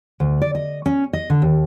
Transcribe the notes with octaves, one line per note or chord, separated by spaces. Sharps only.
D2
D5
D#5
C#4
D#5
D3
D#2